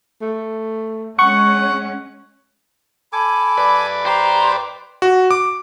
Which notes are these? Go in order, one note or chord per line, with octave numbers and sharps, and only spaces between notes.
A3
G#3 C#4 F#5 C#6
A4 G#5 B5 D6
B4 D5
G4 C5 A#5
F#4
D6